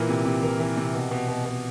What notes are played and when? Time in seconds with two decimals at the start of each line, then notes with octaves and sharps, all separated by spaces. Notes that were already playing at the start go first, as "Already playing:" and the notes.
Already playing: A#2 E3 A#4
0.09 C3
0.25 C3
0.42 E3 A#4
0.59 E3
0.77 C3
0.94 B2
1.11 B2
1.28 B2
1.45 B2